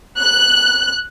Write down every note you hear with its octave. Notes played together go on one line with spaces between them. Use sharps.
F#6